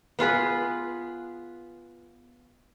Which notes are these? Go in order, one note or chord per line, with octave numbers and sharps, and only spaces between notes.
B3 F4 G#4 B4